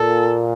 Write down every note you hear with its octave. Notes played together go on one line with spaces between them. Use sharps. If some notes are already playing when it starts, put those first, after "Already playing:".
Already playing: A#2 A4